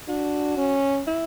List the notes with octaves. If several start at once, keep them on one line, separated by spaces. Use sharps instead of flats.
D4 F#4
C#4
E4